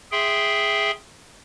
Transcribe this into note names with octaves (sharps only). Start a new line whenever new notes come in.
G#4 E5 G5 C6